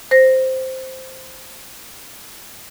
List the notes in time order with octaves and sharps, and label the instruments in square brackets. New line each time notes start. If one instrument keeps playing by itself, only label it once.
[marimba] C5 A#6